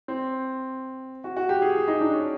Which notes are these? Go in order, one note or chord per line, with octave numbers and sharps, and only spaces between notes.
C4
F#4
F#4
G4
G#4
G#4
D#4
D4
C#4